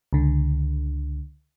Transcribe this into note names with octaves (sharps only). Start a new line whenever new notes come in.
C#2 D3